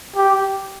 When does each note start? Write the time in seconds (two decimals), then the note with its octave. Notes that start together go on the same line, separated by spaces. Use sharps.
0.16 G4